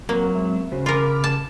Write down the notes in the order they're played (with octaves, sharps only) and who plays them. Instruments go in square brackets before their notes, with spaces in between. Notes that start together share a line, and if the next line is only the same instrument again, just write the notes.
[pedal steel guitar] F#3 [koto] A#3 [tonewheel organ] C4 F#5
[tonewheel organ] G#3 C4 E5
[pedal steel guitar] C#3 [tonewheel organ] C#4 F#4 C5
[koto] F4 A#4 [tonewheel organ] B5 D6 F6
[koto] A5